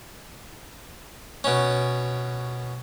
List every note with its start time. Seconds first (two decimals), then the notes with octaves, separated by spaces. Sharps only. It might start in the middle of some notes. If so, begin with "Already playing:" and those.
1.44 B2 C#4